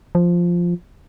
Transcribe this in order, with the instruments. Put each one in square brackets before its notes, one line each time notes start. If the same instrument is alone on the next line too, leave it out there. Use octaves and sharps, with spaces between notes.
[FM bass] F3